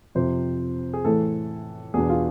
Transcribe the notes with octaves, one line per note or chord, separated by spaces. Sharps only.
F2 C3 F3 C5
G#4
A2 E3 A3 A4
E2 B2 B3 D4 G#4
F4